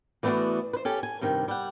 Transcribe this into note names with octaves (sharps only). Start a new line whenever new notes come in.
E3 A3 B3 C#4 D4 F#4
B4 C5
C#4 G4 A4 G#5
G#5
G2 C3 D#3
G3 F#5